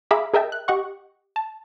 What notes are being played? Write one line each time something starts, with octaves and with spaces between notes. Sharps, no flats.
G#4 E5 F5 A#5 B5 D6
G#4 A#4 D#5 E5 G5 A5
F#6
G4 D#5 F#5 C#6
A5